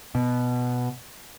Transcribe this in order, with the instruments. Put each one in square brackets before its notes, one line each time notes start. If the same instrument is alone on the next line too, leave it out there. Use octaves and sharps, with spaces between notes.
[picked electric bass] B2